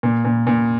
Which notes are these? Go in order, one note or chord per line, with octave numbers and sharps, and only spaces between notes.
A#2
A#2
A#2